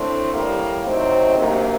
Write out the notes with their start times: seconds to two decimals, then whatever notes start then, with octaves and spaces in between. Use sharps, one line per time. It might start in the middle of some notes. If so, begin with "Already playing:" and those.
Already playing: A2 A3 C4 D4
0.32 A2 G3 A#3
0.84 C3 F#3 A3 C4 D#4
1.37 D2 C3 F#3 A#3